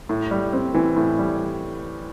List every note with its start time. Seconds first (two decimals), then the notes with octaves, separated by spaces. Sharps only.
0.09 A2
0.31 G3
0.53 C4
0.74 E3
0.97 A2
1.19 G3